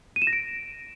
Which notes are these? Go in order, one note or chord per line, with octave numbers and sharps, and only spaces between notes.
D#7
E7
A#6
D7